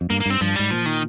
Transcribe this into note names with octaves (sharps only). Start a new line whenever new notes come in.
F2
G2 A#3
A#3
G2 C4
G2 F3
G#2 G3
A#2 F3
D#3